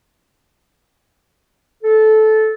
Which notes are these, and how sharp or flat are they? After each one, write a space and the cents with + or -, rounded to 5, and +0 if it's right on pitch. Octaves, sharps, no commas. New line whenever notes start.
A4 -15